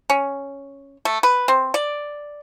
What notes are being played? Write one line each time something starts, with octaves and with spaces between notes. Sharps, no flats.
C#4
A3
B4
C4
D5